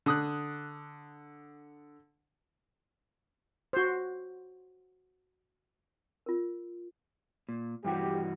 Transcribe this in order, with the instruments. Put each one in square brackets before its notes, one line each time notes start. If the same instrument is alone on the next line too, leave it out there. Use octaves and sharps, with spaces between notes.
[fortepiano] D3 D#6 F#6
[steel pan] F#4 C5
[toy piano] F4 A#4
[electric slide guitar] A#2
[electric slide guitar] G2 E3 F#4 [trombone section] G4